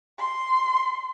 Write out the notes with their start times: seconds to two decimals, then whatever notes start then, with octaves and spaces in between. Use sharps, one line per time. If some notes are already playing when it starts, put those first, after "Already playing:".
0.19 C6